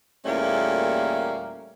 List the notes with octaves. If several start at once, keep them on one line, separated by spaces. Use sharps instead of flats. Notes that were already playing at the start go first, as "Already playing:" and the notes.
E2 A#2 G3 A3 A#3 C#4